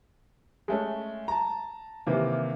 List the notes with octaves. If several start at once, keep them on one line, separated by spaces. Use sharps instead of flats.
G#3 A3 C#4
A5 A#5
C3 D#3 E3 A#3